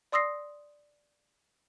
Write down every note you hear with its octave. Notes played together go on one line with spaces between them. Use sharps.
D5 C6 D#6 E6 A#6 C7